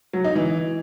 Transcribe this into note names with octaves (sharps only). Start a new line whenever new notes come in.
F#3
D#4
E3